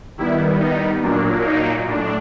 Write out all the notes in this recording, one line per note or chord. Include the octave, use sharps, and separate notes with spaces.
D#3 G3 B3 E4
D#4
A#2 F#3 A#3 D4
D#4
A2 D4